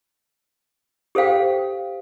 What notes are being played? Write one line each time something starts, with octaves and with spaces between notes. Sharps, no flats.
G4 A4 C5 F5 G5